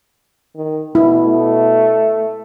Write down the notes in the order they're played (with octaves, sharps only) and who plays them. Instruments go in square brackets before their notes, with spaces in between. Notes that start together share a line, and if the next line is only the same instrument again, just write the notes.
[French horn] D#3
[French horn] B2 [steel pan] E4
[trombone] A3